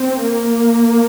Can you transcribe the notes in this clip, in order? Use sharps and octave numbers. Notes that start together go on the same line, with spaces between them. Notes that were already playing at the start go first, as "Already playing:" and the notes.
Already playing: C4
A#3